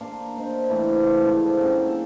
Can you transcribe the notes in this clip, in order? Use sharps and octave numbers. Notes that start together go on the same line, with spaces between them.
A#3 D4 A#4 C6
D4 C5 D#5
E3 A3 C4
G#2 D3 F3 E4
F#3 A#3 C#4 G4
D4 G#4 A4